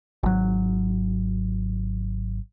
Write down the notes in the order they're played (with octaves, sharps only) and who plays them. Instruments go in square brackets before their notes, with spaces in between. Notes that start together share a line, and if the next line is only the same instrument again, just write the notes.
[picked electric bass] G#1 F#3